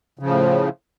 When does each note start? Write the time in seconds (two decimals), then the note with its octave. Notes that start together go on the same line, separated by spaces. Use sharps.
0.19 C#3
0.23 F3
0.26 A2